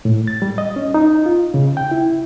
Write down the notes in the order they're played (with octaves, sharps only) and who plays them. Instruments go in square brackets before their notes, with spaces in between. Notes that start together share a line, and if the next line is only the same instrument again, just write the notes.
[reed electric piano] A2
A6
G3
D#5
C#4
D#4
F4
C#3
G5
E4